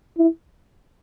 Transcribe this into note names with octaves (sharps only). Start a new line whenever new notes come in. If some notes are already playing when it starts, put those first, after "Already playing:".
E4